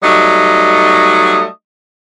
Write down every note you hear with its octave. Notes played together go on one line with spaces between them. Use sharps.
F#3 G3 A3 D#4 D#5